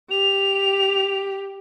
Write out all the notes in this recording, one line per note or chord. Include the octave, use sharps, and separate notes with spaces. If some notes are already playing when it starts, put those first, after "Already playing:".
G4 F7